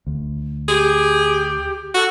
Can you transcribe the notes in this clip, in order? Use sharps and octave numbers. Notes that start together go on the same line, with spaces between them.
D2
G4 G#4
F#4 A4